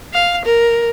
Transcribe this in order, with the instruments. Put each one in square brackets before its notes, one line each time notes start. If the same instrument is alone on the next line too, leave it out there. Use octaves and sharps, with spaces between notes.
[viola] F5
A#4